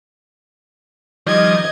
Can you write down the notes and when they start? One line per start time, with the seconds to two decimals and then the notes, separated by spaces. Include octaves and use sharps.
1.27 D#3 F3 G3 D#5 G#6